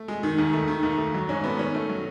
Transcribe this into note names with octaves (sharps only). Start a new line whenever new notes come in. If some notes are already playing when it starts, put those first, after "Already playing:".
Already playing: A3
G#3
D#3
D#2
A3
D#3
D#2
A3
F#3
G#2 C#4
A3 B3
D#3 C#4
A3
F#3